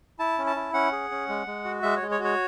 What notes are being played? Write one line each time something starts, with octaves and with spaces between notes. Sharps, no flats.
E4 A5
C#4
A5
E4
C#4 F#5
G#4
C#4
G#3
G#3
F#4
G#3 E5
C#5
G#3
C#5
F#4
C#5